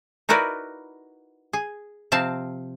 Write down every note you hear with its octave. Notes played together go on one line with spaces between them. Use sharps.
D#4 E4 F#4 A#4 B4 D5
G#4
C3 F3 C4 F5 A5